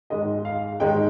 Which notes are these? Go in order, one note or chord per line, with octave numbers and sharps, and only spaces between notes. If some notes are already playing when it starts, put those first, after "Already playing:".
G#2 D#3 G#3 D#5
F5
G#2 D#3 G#3 G5